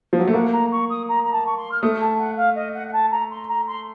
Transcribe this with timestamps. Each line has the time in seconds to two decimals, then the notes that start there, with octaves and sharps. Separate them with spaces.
0.13 F3
0.19 F#3
0.28 A3
0.34 A#3 F#5
0.52 A#5
0.72 C#6
0.90 D#6
1.09 A#5
1.24 A#5
1.32 A5
1.46 C#6
1.57 C6
1.72 F6
1.82 A3 D#6
2.01 A5
2.19 F#5
2.37 F5
2.56 D#5
2.74 F#5
2.88 F#5
2.93 A5
3.11 A#5
3.31 C6
3.48 A#5
3.67 C6